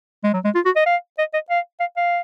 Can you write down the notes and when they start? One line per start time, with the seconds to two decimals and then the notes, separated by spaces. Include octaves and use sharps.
0.24 G#3
0.34 F#3
0.45 G#3
0.55 F4
0.66 F#4
0.76 D#5
0.87 F5
1.19 D#5
1.34 D#5
1.50 F5
1.80 F5
1.97 F5